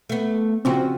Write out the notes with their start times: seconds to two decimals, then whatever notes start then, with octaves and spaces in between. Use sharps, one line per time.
0.09 A3 B3
0.65 C#3 C4 F4 F#4